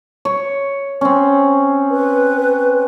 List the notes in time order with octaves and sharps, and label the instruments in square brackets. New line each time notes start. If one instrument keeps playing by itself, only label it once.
[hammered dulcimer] C#5
C4 C#4
[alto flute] B4